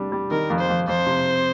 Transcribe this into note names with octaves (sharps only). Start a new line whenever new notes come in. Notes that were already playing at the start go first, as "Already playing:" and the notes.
Already playing: G3 D4
G3
D#3 A#4
F2
C5
F2
F2 C5
C3